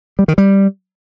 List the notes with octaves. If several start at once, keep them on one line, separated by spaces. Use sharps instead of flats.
G3
D#3
G3